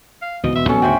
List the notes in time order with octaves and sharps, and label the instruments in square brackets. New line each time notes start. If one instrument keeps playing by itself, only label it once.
[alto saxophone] F5
[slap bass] C#2 G#2 E3 [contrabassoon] B2 [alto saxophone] D#5
[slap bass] E1 [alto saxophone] E5
[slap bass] A#1 G3 [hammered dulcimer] C#4 [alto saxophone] A4
[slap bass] D2 G#2 C#3 [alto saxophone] F#4 [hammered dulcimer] C5 E5 G5